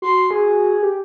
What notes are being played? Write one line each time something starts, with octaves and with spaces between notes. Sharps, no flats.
F#4 C6
G#4
G4